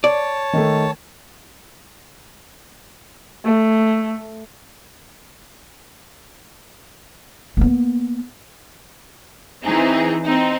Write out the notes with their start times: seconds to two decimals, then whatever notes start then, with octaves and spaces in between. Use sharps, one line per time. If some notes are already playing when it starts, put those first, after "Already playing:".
0.04 C#5 D5 A5
0.53 D#3 A3
3.45 A3
7.57 A#3 B3
9.65 E3 C4 D#4 G#4
10.26 C4 D#4